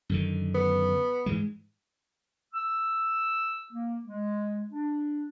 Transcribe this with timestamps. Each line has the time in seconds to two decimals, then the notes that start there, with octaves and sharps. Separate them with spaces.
0.09 F#2 D3 D#3
0.55 B3
1.26 G#2 E3 G#3
2.54 E6
3.73 A#3
4.06 G#3
4.72 D4